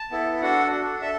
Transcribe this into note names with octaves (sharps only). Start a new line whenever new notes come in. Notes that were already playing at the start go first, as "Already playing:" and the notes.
Already playing: A5
B3 E4 A4
D4 F#4 A4 F#5
D4 A4
A4 E5